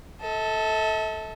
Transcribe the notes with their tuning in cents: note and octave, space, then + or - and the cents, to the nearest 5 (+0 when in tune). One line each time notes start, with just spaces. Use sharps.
A4 +0 E5 -45